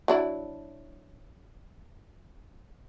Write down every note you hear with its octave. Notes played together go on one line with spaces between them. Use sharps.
F#3 D4 E4